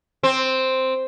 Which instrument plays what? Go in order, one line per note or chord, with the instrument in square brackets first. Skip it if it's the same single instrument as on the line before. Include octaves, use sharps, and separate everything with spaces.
[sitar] C4